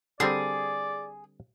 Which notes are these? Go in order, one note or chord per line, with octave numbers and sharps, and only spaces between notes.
D3 G3 C4 G#4 D5